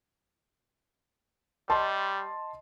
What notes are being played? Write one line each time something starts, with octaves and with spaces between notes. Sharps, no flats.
G3 D#5 A5 C6